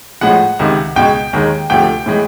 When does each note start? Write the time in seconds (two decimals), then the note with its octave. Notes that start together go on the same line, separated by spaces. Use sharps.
0.21 A2 F3 G#3 F#5
0.59 C#2 C3 D#3
0.96 C#2 B2 G#3 G5
1.33 D#2 D#3 G#3
1.70 D2 C3 F3 A3 G5
2.06 A2 E3 G#3